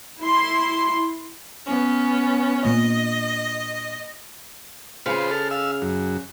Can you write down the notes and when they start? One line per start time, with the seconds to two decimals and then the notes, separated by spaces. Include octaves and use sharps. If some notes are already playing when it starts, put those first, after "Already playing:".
0.20 E4 C6
1.66 B3 C#4
2.65 A#2 D4 D#5
5.06 C#3 F4 G#4 B4 C5
5.31 A4 F6
5.51 F5 E6
5.82 F#2